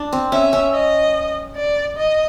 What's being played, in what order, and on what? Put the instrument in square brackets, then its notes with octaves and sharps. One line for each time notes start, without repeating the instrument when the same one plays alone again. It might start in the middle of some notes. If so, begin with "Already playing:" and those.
Already playing: [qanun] D4
C4
[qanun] C#4 [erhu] E5
[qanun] C#4
[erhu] D#5
D5
D#5